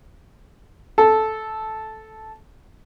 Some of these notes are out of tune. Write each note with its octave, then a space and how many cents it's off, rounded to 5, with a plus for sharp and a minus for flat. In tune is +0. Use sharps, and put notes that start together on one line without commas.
A4 -10